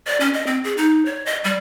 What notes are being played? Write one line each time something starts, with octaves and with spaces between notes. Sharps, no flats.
D5
C#4
D#5
C4
G#4
D#4
C#5
D#5
G3